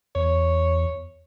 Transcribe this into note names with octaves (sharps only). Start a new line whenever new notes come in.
E2 C#5